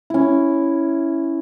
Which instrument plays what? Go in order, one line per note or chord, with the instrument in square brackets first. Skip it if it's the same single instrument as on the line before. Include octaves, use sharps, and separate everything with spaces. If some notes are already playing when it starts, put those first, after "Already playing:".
[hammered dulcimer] C#4 E4